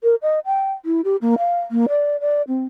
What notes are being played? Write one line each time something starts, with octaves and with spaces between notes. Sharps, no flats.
A#4
D#5
G5
E4
G4
A#3
F5
A#3
D5
D5
C4